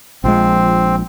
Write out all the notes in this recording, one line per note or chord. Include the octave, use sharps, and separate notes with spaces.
A#1 F3 G#3 C4